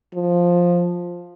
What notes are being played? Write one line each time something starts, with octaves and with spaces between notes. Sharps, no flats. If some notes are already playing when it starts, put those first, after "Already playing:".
F3